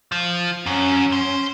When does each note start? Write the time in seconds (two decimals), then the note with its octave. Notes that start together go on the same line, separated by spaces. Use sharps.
0.12 F3
0.66 F#2 C#4
1.12 C5